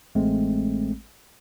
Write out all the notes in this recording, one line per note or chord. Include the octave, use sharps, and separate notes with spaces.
A1 G#3 A3 C4